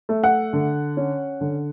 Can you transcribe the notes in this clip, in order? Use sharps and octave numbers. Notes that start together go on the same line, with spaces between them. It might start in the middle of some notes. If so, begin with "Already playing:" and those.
A3
F#5
D3
C#4
D3